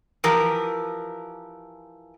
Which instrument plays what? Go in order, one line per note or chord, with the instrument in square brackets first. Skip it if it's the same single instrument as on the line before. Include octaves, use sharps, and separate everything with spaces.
[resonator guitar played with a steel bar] E3 F3 G4 A#4